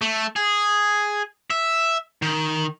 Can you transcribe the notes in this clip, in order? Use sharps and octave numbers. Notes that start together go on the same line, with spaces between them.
A3
G#4
E5
D#3